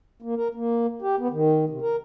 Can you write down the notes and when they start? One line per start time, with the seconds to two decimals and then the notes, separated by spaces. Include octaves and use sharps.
0.22 A#3
0.37 A#4
0.55 A#3
1.02 G4
1.19 B3
1.31 D#3
1.70 C3
1.82 A#4